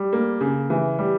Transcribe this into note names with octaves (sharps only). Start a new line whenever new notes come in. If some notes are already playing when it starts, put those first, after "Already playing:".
Already playing: G3
A#3
C#3
E3
G3